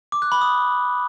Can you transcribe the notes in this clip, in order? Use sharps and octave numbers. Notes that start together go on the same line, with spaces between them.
D6
F#6
B5
D#6